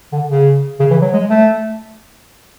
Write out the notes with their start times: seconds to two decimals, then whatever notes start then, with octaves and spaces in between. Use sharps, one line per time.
0.12 D3
0.30 C#3
0.80 C#3
0.91 E3
1.02 F#3
1.13 G#3
1.30 A3